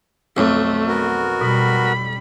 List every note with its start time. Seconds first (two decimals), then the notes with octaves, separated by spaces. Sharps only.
0.37 B1 F2 A3
0.87 B3 F#4 A#4
1.41 B2 G3 B5